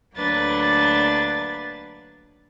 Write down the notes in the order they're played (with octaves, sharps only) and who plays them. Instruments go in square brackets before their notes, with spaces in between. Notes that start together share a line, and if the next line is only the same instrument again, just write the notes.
[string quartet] D2 F#3 A#3 D4 B4 A6